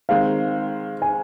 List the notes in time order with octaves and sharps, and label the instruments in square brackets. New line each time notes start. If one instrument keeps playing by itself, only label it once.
[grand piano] D#3 G#3 C4 [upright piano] F5
[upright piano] G#5